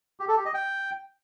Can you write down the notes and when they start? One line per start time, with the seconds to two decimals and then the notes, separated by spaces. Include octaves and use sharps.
0.20 G4
0.28 A4
0.37 G4
0.45 D#5
0.54 G5